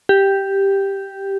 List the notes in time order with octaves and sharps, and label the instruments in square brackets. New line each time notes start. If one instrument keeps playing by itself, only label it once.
[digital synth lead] G4